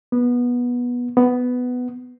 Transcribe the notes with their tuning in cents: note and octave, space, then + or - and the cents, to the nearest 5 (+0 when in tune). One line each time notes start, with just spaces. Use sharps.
B3 -15
B3 +10